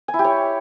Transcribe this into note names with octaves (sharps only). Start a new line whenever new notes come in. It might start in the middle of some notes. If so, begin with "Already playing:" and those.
G#5
E4
G4
C#5